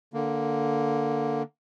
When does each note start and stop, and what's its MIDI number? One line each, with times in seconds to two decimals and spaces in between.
0.13 1.43 50
0.13 1.43 58